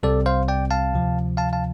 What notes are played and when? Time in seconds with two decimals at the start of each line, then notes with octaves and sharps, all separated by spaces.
0.03 C2 C3 G3 C4 A4 D5
0.26 C5 F5
0.48 D5 G5
0.71 F5 A5
0.93 D2 C3 F3
1.37 F5 A5
1.53 F5 A5